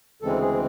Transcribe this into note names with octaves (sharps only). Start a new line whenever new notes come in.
D2 C#3 E3 G#3 C4 A4
G#4